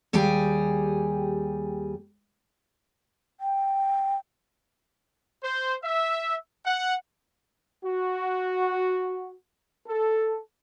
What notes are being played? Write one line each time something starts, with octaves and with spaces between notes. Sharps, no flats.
D#2 G3 G4 G#4 G5 G#5
G5
C5
E5
F#5
F#4
A4